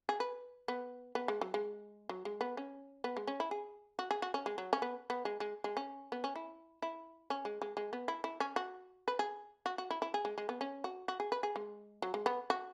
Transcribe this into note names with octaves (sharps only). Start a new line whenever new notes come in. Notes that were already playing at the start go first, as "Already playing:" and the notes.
G#4
B4
B3
B3
G#3
F#3
G#3
F#3
G#3
B3
C#4
B3
G#3
C#4
E4
G#4
F#4
G#4
F#4
C#4
G#3
F#3
C#4
B3
B3
G#3
G#3
G#3
C#4
B3
C#4
E4
E4
C#4
G#3
G#3
G#3
B3
E4
E4
C#4
F#4
B4
G#4
F#4
F#4
E4
E4
G#4
G#3
G#3
B3
C#4
F#4
F#4
G#4
B4
G#4
G#3
F#3
G#3
B3
F#4